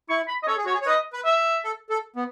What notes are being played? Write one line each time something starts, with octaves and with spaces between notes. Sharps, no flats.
E4 C#6
B5
D#5
A4 C#5
G#4
F#4 C#5
G#4
C#5
B4 D#5
B4
E5
A4
A4
B3